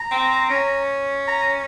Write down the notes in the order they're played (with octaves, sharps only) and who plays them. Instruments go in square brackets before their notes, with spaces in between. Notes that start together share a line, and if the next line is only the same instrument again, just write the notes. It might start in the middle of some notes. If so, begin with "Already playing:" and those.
Already playing: [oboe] A#5
[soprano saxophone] C4
C#4
[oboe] A#5